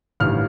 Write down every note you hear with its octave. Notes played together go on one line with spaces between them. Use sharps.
A1 G2 D#3 G3 F6